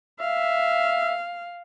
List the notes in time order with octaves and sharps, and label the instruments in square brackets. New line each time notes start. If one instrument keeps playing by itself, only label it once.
[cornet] E5 [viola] F5